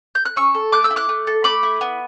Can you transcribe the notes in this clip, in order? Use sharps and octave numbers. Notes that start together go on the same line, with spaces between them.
G6
F#6
C#4 C#6 E6
A4
A3 D6 F#6
E6 G6
E4
D6 F#6
A3
A4
A3 B5 D6
E4
B3